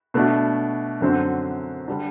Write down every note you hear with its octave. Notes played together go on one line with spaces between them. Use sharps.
B2 A3 D4 F#4
F#2 D3 F#3 C4
D3 G3 D4